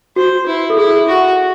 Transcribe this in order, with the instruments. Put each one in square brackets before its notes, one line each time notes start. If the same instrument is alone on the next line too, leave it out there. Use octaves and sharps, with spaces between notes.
[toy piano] F#4 [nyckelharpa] C5
[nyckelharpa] E4
[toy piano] A4
[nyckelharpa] E4 [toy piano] G#4
[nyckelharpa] F#4